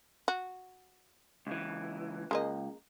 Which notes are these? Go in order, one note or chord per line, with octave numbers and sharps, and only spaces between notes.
F#4
C#2 E3
C#2 G#3 A#3 D#5